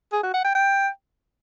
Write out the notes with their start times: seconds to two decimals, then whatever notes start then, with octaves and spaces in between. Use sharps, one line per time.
0.12 G#4
0.23 F#4
0.34 F#5
0.44 G5
0.55 G5